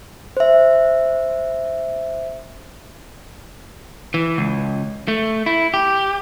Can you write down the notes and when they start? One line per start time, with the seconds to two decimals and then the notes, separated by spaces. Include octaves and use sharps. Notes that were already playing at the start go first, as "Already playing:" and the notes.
0.37 C5 E5
4.14 E3
4.38 C#2
5.08 A3
5.46 E4
5.74 G4